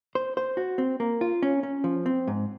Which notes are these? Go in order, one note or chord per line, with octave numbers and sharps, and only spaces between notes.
C5
C5
F#4
C4
A#3
F4
C#4
C#4
F3
C4
G#2